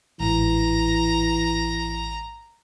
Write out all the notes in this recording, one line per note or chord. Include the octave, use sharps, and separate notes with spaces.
A1 G#2 E3 A#5